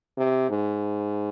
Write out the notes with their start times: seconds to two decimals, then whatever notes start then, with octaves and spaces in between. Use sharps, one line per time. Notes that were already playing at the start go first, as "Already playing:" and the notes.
0.17 C3
0.50 G#2